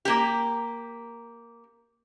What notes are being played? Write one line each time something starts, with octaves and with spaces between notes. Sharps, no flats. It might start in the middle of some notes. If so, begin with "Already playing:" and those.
A#3 G4